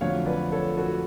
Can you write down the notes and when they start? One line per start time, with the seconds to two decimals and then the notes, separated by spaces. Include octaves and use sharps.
0.01 F2 D3 F#3 A3 C#5 F5
0.26 B4 D5
0.52 A4 C#5
0.77 F#4 A4